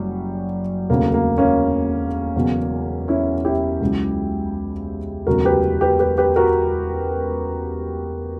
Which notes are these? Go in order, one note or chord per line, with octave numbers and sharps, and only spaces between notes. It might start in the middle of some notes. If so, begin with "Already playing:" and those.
Already playing: F#1 F#2 G3
E1 D2 C#3 F#3 A#3
A#3
A#3 C#4
E1 E2 C#3 F#3
C#4 E4
E4 G4
C#2 C#3 F#3
E1 D2 C#3 F#3 F#4 A#4
G4 B4
G4 B4
G4 B4
G4 B4
F#4 A#4